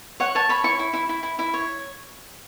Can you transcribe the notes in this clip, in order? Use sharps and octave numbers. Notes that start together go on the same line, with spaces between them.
C#5 F#5
C#5 A5
C#5 B5
E4 C#6
E4
E4
E4
E4
E4
C#5